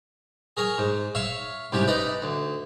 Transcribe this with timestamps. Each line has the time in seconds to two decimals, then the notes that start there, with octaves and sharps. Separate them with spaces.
0.57 G#4 A#4 C#5 G#5
0.78 G#2
1.15 C#5 E5 F5
1.72 C2 G#2 C#4 G4
1.87 D#4 B4 D5 D#5
2.22 D2